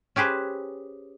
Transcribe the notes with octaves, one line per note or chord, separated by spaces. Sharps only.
C#4 G4 G#4 B4 C5